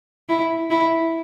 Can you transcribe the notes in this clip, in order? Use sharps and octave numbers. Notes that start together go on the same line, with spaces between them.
E4
E4